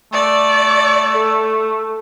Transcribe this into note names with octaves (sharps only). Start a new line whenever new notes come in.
A3 D5
A4